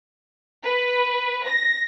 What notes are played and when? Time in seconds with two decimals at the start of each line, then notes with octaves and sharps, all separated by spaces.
0.65 B4
1.47 A#6